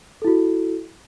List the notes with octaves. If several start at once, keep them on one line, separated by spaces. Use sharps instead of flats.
E4 F#4 A4